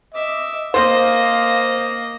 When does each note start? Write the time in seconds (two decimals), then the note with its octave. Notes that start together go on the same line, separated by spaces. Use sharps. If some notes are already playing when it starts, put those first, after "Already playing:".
0.14 D#5 E5 D6
0.74 A#3 C5 D#5 F5